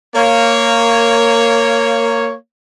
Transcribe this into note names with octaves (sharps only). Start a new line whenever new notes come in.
A#3 C#5